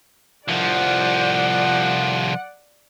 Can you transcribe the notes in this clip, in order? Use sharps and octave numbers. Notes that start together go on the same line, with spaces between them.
C2 F3 D5 F#5